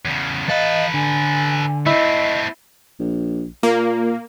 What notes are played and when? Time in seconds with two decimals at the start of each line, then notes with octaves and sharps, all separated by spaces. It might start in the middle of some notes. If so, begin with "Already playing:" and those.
0.05 E2 C#3
0.48 E3 A4 B4 D#5 F5
0.94 D3 G#5
1.86 A3 C4 E4 D#5
3.00 A#1
3.63 A#2 A#3